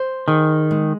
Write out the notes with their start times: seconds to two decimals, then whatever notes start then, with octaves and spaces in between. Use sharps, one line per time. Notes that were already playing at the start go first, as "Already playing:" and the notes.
Already playing: C5
0.28 D#3 G#4
0.71 G#3